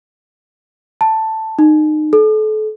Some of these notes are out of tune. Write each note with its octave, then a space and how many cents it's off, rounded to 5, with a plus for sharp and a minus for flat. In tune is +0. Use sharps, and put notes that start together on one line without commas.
A5 +5
D#4 -25
A4 -35